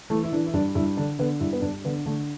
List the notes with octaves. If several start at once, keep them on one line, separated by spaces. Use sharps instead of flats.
E3 A3
E4
E3 D4
E4
G2 D4
G2 E4
D3 D4
D3 B3
G2 E4
B3
G2 D4
D3 B3
D3 A3